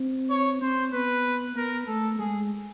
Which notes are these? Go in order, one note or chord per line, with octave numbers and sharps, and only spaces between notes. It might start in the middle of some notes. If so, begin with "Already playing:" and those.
Already playing: C4
C#5
C4 C5
B3 B4
B3 A#4
A3 A4
G#3 G#4